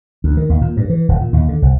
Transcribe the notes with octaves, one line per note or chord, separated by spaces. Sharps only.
D2
D#3
D#2
A#2
G2
E3
D#1
A#2
D#2
D3
C2